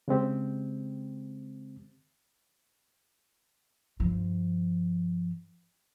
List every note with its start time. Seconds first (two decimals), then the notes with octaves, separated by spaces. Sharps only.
0.08 C#3 G#3 C4 G4
4.00 G2 F3